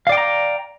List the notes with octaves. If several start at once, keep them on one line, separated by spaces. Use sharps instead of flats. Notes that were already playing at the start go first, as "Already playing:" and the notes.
D5 F5 G5 A#5 D6